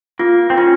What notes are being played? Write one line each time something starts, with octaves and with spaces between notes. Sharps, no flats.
A#3 F4
C4
C#4 F4